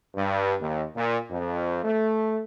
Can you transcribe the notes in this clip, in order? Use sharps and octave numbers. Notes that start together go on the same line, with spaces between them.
G2
D#2
A#2
F2
A3